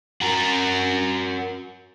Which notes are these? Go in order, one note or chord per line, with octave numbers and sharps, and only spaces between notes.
F#4 A#4